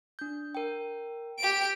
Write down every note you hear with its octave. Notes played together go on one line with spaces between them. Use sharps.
D4 G6
A#4 G5
G4 D7